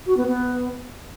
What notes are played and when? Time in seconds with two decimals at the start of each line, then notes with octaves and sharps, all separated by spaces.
0.07 F#4
0.17 B3
0.27 B3